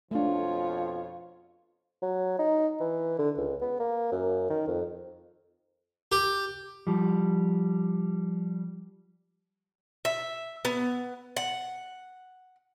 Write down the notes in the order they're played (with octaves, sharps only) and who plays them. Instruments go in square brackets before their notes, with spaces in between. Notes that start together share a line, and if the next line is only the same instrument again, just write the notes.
[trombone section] F2 B2 F3 [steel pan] A3 D4 [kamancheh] F4 C#5
[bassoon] F#3
D#4
E3
D3
C#2
B3
A#3
F#2
D#3
F2
[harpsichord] G4
[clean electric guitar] F3 G3
[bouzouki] E5
B3
F#5